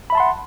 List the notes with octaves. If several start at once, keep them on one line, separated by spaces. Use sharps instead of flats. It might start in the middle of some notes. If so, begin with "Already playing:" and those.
E5 F#5 A5 B5 C6